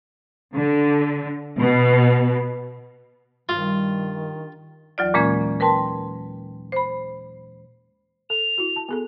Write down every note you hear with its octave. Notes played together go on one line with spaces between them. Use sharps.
D3
B2
G2 D#3 F4
D#2 E3 F#3 F4 D5
A#2 E3 G#3 A#3 C#4 G#6
A#4 B4 G5 A5 C6
C5 B5
A4 F7
E4 F#4
A5
B3 G#4 A4